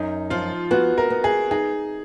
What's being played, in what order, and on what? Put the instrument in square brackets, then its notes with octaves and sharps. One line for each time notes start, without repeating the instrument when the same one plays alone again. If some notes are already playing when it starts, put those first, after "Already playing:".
Already playing: [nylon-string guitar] F#2 [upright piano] D#4
[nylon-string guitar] F3 [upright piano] F4
[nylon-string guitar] B3 [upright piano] F#4
[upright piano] A#4
[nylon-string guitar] B3
[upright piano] G#4
[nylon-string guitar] D#4 [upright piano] G#4